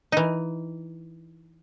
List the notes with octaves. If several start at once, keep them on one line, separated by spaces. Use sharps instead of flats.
E3 D#4